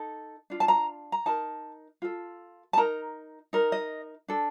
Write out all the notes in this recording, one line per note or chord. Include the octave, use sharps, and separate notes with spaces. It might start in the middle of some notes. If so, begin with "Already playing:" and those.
Already playing: D#4 A4
D4 F4
A5
A#5
A#5
D#4 A#4 A5
F4 A4
A5
D#4 A#4 A#5
D#4 A#4
D#5
D4 A4